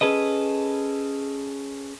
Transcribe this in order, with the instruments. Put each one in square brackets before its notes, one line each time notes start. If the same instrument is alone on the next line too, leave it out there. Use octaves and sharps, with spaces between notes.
[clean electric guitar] C#4 G#4 A4 B4 D#5